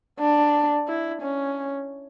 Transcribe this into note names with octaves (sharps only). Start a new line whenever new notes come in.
D4
E4
C#4